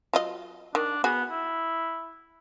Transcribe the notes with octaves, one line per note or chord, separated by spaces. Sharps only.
F#3 F4 D#5
D#3 D4
B3 F#4 G#4
E4